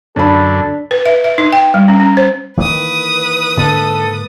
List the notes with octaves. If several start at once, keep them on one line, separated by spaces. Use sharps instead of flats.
F#2 D3 D4 A4 B5
B4
E5
E5
D#4
G5
G3
C#4
C#4
C5
D#3 E3 A#3 B4 D#6
G#2 D3 A#3 A4